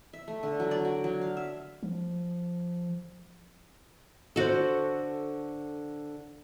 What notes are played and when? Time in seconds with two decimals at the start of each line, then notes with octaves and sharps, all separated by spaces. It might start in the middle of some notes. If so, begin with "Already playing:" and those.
0.13 E5
0.28 A3
0.43 D3
0.60 F#3
0.71 D5
0.85 F#4
1.04 F#3
1.21 F5
1.37 E5
1.83 F3
4.36 D3 F#4 A4 C5